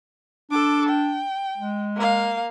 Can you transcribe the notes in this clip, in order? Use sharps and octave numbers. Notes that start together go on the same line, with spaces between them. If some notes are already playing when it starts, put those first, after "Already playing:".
D4 A4 D6
G5
G#3
A#3 F5